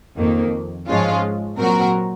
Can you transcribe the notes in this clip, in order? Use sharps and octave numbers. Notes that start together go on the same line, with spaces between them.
F2 D#3 A#3
G#2 F3 G#3 C#4 F4
A#2 F#3 C4 F#4 A#4